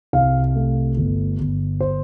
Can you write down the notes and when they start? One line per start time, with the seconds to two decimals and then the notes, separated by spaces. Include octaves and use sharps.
0.13 C2 F5
0.56 A3
0.97 G1
1.39 G1
1.80 C5